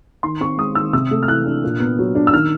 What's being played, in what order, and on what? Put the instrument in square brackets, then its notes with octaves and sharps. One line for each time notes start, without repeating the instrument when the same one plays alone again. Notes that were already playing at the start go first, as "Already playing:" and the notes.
[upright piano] D#3 C6
C4 C#6
G#3 D#6
D#3 E6
C3 E6
A3
F6
E3 F#6
D4
A#2
B3
F#3
D4
E6
D#3 F6